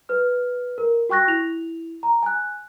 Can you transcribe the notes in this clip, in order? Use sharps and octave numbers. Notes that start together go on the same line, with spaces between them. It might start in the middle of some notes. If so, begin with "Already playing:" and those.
B4 F6
A#4
F#4 G5 C#6 F#6 A#6
E4 F7
A#5
G#5 F#6